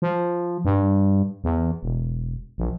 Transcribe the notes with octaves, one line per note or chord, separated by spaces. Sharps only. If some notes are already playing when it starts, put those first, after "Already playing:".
F3
G2
E2
E1
A#1